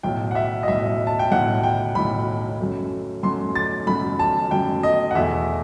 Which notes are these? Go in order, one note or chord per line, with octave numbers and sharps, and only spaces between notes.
B1 A2 F#3 G5
F#5
E5
D#5
B1 A2 F#3 E5
A5
G5
B1 A2 F#3 F#5
G5
B1 A2 F#3 B5
F#2 F#3 A3
F#2 F#3 A3 C6
A6
F#2 F#3 A3 B5
A5
F#2 F#3 A3 G5
D#5
F#5
E2 B2 A3 E5